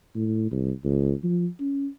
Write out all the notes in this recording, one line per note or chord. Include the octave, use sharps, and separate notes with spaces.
A2
C2
C#2
F3
C#4